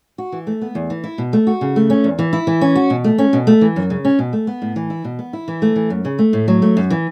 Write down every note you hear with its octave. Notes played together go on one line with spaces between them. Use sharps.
F#4
E3
A3
B3
E2
E3
E4
B2
A3
F#4
C#3
A3
C#4
E2
E3
E4
E3
C#4
F#4
B2
A3
C#4
B2
A3
E3
F#2
C#3
C#4
B2
A3
B3
A2
E3
E4
B2
B3
E4
E3
A3
E3
F#2
C#3
A3
A2
F#3
A3
F#2
E3